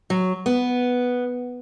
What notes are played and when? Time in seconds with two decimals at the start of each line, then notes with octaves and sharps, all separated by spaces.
0.10 F#3
0.46 B3